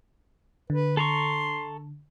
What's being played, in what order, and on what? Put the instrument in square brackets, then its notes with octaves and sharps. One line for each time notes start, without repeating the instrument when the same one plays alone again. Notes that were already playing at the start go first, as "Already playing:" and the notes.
[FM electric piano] D3 [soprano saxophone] B4
[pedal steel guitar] A4 A#5 C#6 [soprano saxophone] C6